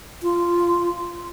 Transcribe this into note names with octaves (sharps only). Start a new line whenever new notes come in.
F4